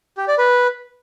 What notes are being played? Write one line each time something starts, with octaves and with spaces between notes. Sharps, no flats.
G4
D5
B4